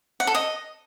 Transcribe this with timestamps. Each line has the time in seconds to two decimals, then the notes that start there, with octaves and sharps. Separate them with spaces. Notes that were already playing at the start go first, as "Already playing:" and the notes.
0.20 F#5
0.27 A4
0.35 D#5